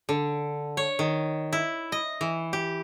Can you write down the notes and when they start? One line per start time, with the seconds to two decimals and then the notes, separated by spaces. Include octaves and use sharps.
0.09 D3
0.77 C#5
0.99 D#3
1.53 E4
1.92 D#5
2.21 E3
2.53 G4